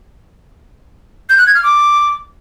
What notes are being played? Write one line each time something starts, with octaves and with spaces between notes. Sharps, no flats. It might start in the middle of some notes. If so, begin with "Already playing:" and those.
G6
F#6
G#6
F6
D6